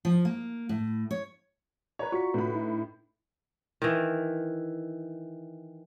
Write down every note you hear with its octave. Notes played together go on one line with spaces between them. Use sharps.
F3
A#3
A2
C#5
B4 C#5 D5 A#5
F4 F#4 C#6 B6
A2 D3 B4 B5
D#4 E4
D#3 E3